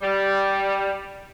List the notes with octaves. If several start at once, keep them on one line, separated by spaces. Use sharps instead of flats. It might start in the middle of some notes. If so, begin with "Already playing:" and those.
G3